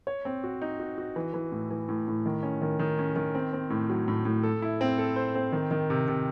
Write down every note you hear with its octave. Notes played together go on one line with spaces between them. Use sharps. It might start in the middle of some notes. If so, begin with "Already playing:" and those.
C#5
C4
F#4
D#4
F#4
F#4
E3
E3
A2
E3
A2
A2
D#3
C#4
D#3
D#3
C#4
D#3
C4
C4
A2
F#3
A2
A2
A4
E4
C4
A4
C5
C4
D#3
D#3
C3
C3